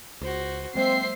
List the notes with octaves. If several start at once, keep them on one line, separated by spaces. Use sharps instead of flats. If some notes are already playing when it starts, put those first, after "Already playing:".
C#2 F#4 C5
F#3 G#3 A#3 C4 C5 E5 C7